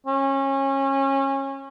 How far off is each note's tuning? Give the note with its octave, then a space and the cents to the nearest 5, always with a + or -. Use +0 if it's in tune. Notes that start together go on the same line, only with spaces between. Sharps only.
C#4 -25